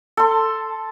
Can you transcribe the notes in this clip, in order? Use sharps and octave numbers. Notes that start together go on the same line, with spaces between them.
A4 C6